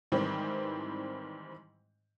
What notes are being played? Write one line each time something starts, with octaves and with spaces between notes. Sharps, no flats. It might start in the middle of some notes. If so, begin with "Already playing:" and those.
G#2 D#3 E3 G3 C4